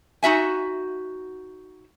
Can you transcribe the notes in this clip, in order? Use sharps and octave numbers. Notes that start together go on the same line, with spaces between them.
D#4 F#4 E5 G#5